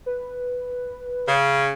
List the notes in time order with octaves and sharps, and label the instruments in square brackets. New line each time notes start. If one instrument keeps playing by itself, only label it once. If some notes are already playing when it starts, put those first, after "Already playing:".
[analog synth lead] B4
[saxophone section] C#3